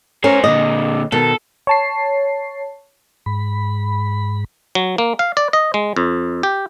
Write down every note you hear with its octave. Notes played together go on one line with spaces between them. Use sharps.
C#4 A#4 C5 G#5
A#2 D3 D#5
B2 D#3 A4
C#5 A5 C7
G#2 B5
F#3
A#3
F5
D5
D#5
G#3
F2
G4